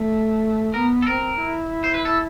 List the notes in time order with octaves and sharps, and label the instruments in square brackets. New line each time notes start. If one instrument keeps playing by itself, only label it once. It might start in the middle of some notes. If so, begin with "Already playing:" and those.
Already playing: [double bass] A3
[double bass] B3 [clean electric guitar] A#4
[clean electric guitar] A4
[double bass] C4 [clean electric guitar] A#4
[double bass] E4
[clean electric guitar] C5
B4
A4